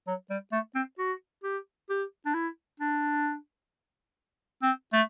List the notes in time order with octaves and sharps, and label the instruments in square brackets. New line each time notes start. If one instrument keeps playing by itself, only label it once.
[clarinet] F#3
G3
A3
C4
F#4
G4
G4
D4
E4
D4
C4
A3